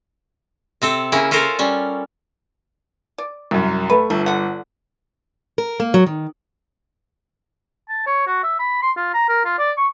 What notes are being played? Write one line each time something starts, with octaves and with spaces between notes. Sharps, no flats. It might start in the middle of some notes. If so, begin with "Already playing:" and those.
C3 C4 A4
C#3 A#3 C#4 E4
C#4 F4 A4 A#4 C5
G3 C#4
D5
C2 F#2
A3 B4
G1 A3
D3 F#5
A#4
A#3
F#3
D#3
A5
C#5
F#4
E5
B5
C6
F4
A#5
A#4
F4
D5
C#6